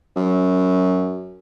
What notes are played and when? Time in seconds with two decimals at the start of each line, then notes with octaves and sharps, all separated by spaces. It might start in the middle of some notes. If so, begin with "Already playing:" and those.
0.16 F#2